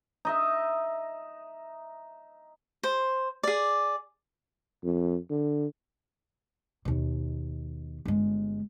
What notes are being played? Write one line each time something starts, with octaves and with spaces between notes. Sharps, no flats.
D#4 D#5 E5
C5
G#4 D5
F2
D3
D#2 B2
G1 G#3